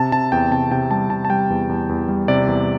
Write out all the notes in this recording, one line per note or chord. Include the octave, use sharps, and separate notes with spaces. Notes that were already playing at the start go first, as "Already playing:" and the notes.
Already playing: C3 A5
C3 A5
E2 G5
C3 A5
C3 G5
G3 A5
C3 A5
A5
G3 G5
E2
E2
E2
G3
C3 D5
E2